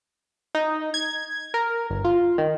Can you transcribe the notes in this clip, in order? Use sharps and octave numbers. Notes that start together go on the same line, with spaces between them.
D#4
G#6
A#4
G1
F4
D#3